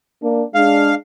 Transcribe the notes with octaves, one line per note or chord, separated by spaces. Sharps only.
A#3 D4
G#3 D4 F5